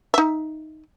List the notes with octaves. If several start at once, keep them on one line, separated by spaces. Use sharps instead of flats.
D#4 E5